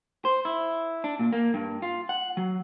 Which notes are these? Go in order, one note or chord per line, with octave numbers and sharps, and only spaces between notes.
C5
E4
D4
A#2
A#3
G2
F4
F#5
F#3